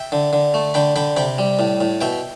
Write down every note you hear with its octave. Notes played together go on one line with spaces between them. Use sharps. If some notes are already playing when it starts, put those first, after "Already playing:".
Already playing: E5 G5
D3
D3
A3
D3 G5 B5
D3 G5 B5
C3 G5 B5
G3
A2
A2
B2 E5 G5